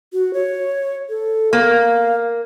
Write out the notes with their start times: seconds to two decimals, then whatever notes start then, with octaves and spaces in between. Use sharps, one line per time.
0.13 F#4
0.34 C#5
1.09 A4
1.53 A#3 F5